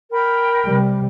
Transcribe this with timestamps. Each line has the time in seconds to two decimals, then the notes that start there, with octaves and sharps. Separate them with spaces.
0.10 A#4 G5 B5
0.65 C3 G3